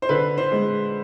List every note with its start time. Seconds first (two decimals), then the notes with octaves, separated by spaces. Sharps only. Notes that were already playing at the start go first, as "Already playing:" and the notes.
0.02 C5
0.09 D3 B4
0.38 C5
0.52 G#3